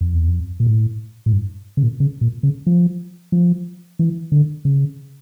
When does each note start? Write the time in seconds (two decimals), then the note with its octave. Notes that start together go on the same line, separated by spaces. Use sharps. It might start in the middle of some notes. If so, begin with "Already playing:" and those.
0.01 F2
0.13 E2
0.28 F2
0.60 A#2
0.67 A2
1.26 A2
1.32 G2
1.77 C#3
1.83 A#2
2.00 C#3
2.21 A#2
2.43 C#3
2.67 F3
3.32 F3
3.99 E3
4.32 D3
4.65 C#3